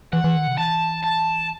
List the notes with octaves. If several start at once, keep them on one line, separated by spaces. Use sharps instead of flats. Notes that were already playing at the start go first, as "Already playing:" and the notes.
E3 F#5
E3
D#3
C3
E3 A5
A5